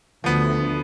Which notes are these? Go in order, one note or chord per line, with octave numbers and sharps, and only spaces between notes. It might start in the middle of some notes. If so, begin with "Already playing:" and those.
D2 F3 B3